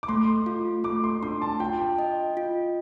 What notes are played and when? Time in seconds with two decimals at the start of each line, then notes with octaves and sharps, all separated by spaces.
0.03 D6
0.08 A3 C6
0.46 F4
0.84 A3 D6
1.04 C6
1.23 D4 C6
1.42 A5
1.60 F4 G5
1.99 D#5
2.37 F4